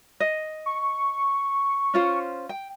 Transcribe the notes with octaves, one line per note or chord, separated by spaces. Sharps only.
D#5
C#6
C#4 F4 C5
G5